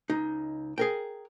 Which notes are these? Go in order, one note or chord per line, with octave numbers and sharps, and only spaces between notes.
C#2 D#4
G#4 A#4 G5